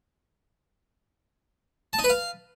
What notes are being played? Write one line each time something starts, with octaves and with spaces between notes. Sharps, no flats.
A5
D#4
B4
F5